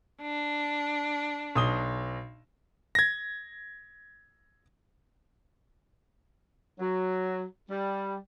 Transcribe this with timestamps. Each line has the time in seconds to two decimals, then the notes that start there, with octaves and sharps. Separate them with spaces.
0.21 D4
1.55 B1 D#6 G7
2.95 G#6 A#6
6.80 F#3
7.71 G3